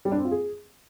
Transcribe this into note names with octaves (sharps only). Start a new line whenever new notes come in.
G3
D4
C4
F4
G#4